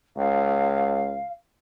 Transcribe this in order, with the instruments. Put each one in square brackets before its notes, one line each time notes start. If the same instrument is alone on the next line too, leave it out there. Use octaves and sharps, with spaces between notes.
[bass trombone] C#2 [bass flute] F5